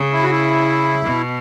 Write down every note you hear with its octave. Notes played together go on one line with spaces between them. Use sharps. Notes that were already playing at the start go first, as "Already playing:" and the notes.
Already playing: C#3
E4
F#4
E4
B2